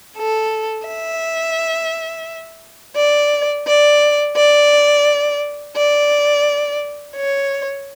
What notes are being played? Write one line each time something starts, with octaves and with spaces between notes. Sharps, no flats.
A4
E5
D5
D5
D5
D5
C#5